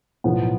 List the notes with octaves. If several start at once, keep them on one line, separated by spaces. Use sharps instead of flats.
B1 A2 F3 B3